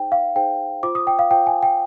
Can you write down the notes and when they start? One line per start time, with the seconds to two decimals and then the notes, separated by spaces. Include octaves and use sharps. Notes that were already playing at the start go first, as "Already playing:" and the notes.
Already playing: D#4 G#4 C5 G5
0.12 F5
0.35 D#4 G#4 C5 G5
0.83 F4 C5 D6
0.95 D#6
1.07 G5
1.19 F5
1.31 F4 C5 G5
1.47 G#5
1.63 G5